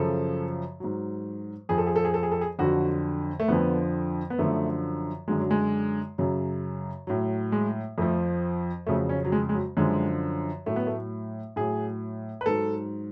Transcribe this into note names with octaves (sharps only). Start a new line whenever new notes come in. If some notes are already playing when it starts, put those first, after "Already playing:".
Already playing: F#2 C#3 F3 A4
G#2 F#3
F2 F3 G#4
A4
G#4
A4
G#4
A4
G#4
A4
G#4
F2 D3 F#3 F#4
A3
F2 D3 F3 B3
B3
F#2 D3 F3 A3
F#2 D3 F#3 G#3
F#3
G#3
F#2 C#3 F#3
A2 F#3
G#3
F2 F3 A3
F2 C#3 F#3 A3
C#4
F#3
G#3
G#3
F#3
F#2 D3 F3 G#3
A2 F#3 A3
B3
A3
A2 F#3 G#4
B4
G#2 F#3 A4